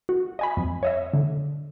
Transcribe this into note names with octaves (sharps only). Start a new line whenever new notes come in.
F#4
D#5 G#5 B5
F2
C#5 D#5 E5
D3